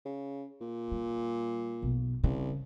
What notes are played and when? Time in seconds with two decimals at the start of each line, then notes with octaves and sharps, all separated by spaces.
0.05 C#3
0.61 A#2
0.92 G3
1.83 B1
2.24 C2 C#3